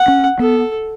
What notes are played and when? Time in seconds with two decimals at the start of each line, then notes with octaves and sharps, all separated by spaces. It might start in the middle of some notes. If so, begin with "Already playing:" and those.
Already playing: F#5
0.08 C#4
0.39 B3 A4